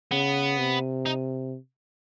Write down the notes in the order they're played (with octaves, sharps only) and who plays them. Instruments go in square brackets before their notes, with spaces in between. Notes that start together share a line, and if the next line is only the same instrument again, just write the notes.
[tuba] C#3 [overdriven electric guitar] B3
[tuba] C3
[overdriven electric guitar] D#4